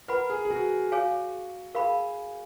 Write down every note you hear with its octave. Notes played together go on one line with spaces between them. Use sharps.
A#4 B4 F#5 B5
G#4
G#4
F#4
G#4 C#5 F5 G#5
G#4 A#4 F5 B5